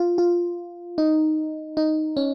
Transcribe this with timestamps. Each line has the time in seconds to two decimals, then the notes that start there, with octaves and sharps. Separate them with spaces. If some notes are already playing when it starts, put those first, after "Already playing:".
Already playing: F4
0.18 F4
0.98 D#4
1.77 D#4
2.17 C#4